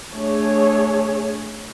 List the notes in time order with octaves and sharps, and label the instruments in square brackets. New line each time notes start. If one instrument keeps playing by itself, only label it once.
[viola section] A3 D4 G#4 C#5